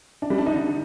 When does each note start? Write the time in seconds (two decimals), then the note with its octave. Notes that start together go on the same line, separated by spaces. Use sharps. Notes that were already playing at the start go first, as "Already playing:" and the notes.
0.22 D4
0.30 G3
0.38 D4
0.46 D#4
0.54 D3